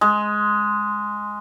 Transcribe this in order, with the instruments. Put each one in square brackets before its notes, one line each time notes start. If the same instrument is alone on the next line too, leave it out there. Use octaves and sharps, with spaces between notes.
[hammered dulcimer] G#3